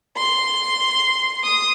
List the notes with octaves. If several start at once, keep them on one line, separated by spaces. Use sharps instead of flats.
C6
D#6